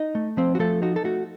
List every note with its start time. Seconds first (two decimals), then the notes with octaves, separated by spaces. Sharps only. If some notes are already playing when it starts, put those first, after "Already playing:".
Already playing: D#4 D#5
0.15 A3
0.37 F3 C4 C5
0.55 F#4
0.59 F3 A3 A4
0.82 D#4 F#4
0.96 A4
1.04 A3 F#4